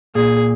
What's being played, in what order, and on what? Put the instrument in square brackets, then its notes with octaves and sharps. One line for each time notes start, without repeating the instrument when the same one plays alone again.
[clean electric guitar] A#2 [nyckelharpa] G#4